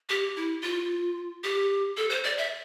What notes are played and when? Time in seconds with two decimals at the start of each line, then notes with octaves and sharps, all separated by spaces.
0.09 G4
0.36 E4
0.62 F4
1.44 G4
1.97 A4
2.10 C5
2.24 D5
2.38 E5